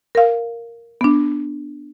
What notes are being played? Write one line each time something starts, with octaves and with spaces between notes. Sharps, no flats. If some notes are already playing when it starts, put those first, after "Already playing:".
A#4 F5
B3 D4